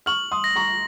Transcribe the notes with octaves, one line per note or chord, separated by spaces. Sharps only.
C#6 F6 F#7
C6 D#6
A#6
A#5 C#6